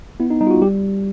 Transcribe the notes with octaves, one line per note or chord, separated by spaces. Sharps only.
B3 E4
D#4
G3 D#4
F4
F#4
G3 G4